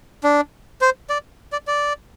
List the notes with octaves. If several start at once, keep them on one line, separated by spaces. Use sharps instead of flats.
D4
C5
D5
D5
D5